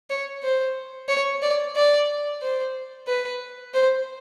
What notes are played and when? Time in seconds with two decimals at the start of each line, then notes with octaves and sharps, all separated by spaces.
0.10 C#5
0.43 C5
1.09 C#5
1.42 D5
1.76 D5
2.42 C5
3.08 B4
3.74 C5